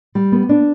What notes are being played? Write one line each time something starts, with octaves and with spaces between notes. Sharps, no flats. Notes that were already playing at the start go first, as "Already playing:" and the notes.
G3
B3
D4